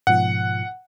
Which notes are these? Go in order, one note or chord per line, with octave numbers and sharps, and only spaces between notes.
G#2 B2 F3 F#5